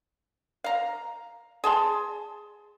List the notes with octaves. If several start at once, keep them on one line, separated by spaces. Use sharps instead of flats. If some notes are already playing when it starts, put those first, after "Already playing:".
F5 A#5
G#4 A5 C6